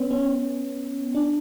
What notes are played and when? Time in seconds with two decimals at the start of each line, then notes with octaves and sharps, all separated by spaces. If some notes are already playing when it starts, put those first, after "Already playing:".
Already playing: B3 C#4
0.11 C#4
1.15 D4